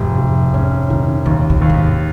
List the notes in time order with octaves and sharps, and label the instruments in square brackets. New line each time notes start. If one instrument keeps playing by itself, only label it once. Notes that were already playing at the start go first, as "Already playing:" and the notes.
Already playing: [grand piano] F1 [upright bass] G#2
[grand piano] F1
[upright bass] G#2 [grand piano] C#4
[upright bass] A#2 [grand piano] D#3
[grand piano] D#2 [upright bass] A#2
[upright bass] A#2
[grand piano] D#2
[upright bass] A#2
G#2